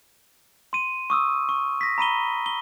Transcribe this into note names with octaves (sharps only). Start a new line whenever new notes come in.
C6 D#7
C#6 D#6 E6
C#6
A#6 B6
A#5 B5 D#7 G7
G7